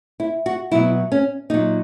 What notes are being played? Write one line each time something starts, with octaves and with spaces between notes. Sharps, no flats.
E4
F#4
B2 F#3 E4
C#4
A#2 F#3 D#4